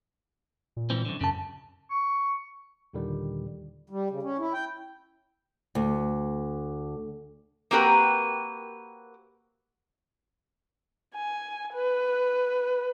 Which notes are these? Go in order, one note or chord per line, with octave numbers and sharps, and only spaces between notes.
A#2
G#2 E3 C4
F#2 D3
F#2 C#3 A5
C#6
D#2 A#2 D3 D#3 G3
G3
C#3
C#4
E4
G5
D2
A#3 C4 F#4 G4 A#4 B4
G#5
B4